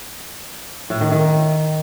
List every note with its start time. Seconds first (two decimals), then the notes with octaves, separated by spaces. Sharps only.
0.90 A2
1.01 D#3
1.12 D#3